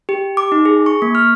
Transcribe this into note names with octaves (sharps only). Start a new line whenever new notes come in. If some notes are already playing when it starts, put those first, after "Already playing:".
G4
D6
D#4
G#4
C#6
A#3
F6